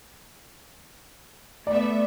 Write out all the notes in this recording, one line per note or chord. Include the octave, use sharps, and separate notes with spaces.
A3 B3 D5 E5